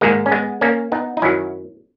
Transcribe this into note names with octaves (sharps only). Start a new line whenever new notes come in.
G#2 D#3 G#3 A#3
C#4
G#3 B3
A#3 C#4
B3 D#4
D#4
F#2 D#3 F#3 C#4 E4